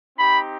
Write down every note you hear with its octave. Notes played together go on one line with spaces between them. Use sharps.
C4 D#4 G4 B5